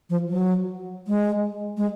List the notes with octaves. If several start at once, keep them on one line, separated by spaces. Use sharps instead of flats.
F3
F#3
G#3
G#3